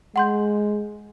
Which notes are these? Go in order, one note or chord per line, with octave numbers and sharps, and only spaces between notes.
G#3 F#5 C6 G6